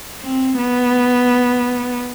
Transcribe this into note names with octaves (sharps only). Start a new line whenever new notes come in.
C4
B3